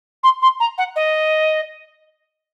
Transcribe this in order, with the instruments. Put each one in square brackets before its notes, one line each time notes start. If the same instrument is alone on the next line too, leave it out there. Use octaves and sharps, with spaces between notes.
[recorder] C6
C6
A#5
F#5
D#5